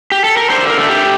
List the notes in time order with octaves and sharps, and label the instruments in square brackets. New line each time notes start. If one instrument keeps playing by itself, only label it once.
[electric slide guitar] G4
A4
A#4
D3 C5
A#4
A3
G4